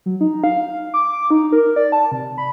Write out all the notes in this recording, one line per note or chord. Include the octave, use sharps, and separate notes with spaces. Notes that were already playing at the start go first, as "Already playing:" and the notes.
F#3
D#4
F5
D6
D6
D#4
A#4
D5
A5
C3
B5